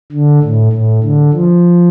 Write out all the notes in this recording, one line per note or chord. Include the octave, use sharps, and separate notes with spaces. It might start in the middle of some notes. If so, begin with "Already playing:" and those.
D3
A2
A2
D3
F3